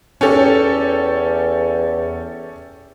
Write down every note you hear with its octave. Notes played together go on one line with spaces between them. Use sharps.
E2 C#4 G4 A4